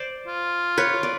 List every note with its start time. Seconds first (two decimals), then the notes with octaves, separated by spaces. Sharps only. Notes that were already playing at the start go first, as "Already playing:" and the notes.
Already playing: C5 D5
0.27 F4
0.78 B4 C#5
1.03 D5